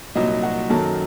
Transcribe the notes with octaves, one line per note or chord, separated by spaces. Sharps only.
C2 A#2 F#3 D#4 D#5
F#4 F#5
F#2 D#3 F#3 A4 A5